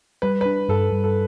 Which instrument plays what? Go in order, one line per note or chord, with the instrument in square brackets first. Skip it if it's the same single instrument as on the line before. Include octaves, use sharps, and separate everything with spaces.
[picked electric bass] G3 [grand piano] B4
[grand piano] B4
[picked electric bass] D4
[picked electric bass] G2 [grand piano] A4
[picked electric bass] G2
[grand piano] A4